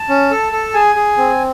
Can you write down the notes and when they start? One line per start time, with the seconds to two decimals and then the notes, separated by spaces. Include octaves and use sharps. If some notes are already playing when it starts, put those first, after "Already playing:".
Already playing: A5
0.09 C#4
0.31 A4
0.52 A4
0.74 G#4 G#5
0.96 G#4
1.17 C4